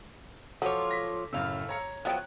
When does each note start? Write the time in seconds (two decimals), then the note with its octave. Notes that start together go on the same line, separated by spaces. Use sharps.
0.62 F3 F#3 F4 A4 C#5 D6
0.91 A#6 B6
1.33 F#2 A2 C#3 A3 F5 E6
1.69 C#5 A#5 C#7
2.05 F3 F#3 B3 D#5 G5 F#6